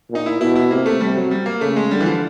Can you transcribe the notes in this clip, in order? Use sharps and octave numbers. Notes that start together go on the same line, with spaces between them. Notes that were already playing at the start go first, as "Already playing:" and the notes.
A#2 D#4
E4
B2 E4
E4
C3 A#3
A3
C3 G3
F#3
G3
A#3
C#3 A3
G#3
D3 G3
E3
F3